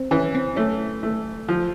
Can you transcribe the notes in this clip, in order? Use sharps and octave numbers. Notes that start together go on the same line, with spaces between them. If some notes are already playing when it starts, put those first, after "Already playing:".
Already playing: C4
E3 C#4
C4
A3 C#4
A3
F3